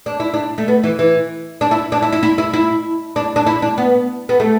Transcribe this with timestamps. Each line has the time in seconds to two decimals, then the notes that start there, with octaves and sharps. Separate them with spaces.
0.06 D4
0.20 E4
0.34 D4
0.58 A3
0.68 B3
0.84 E3
0.99 E3
1.61 D4
1.71 E4
1.92 D4
2.02 E4
2.13 E4
2.23 E4
2.38 E4
2.53 E4
3.16 D4
3.36 D4
3.47 E4
3.62 D4
3.78 B3
4.29 B3
4.40 A3